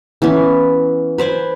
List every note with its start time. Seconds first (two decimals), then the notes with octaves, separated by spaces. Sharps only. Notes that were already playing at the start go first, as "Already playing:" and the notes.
0.22 E3 B3 C#4
1.18 B4 C5 D5 G#5